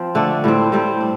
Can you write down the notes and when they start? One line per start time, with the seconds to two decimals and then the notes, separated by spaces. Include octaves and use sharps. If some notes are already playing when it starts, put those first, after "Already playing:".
Already playing: F3 C4
0.15 D3 A3 D4
0.44 A2 G3 C4
0.72 A2 G3 C4
1.00 D4